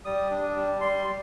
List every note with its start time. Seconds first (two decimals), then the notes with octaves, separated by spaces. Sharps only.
0.05 G3 D#6
0.31 D4
0.56 G3
0.81 G3 C6
1.06 G3